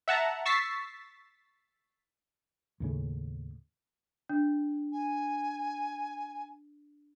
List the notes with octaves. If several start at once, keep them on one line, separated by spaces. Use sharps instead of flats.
E5 F#5 A5 A#5
C#6 E6 A6 B6 C7
D#2 A2 C#3
D4
G#5